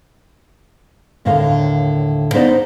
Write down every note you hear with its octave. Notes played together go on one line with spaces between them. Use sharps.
D#2 A2 D3 A#4 F5
B3 D#4 C5 D5 D#5